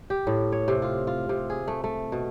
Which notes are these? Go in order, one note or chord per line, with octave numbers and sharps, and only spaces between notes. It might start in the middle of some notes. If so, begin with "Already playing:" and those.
G4
A2
C#5
C3
F4
F4
C3
G#4
A3
A3
B2